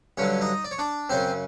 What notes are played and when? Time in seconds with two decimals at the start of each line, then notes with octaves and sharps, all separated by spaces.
0.17 G2 D3 F#3 C#4 C#5
0.41 D#4 D#5
0.64 D5
0.71 C#5
0.79 D4 D5
1.10 F#2 C#3 F#3 C4 C5